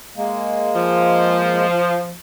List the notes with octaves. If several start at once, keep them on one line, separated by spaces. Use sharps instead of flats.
G#3 A#3
F3